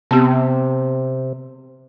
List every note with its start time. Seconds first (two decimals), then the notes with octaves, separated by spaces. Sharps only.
0.11 C3 B3 C4 G4